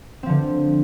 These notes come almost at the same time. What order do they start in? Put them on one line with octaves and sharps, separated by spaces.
C4 F3 D3